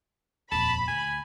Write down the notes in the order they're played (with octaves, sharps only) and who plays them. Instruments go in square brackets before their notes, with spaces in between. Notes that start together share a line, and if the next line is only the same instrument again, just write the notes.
[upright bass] D#1 F2 [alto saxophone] A5 [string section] B5
[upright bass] D2 [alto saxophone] G#5